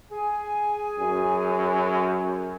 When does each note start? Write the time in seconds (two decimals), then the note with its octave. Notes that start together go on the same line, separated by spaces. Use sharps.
0.11 G#4 G#5
1.00 F#2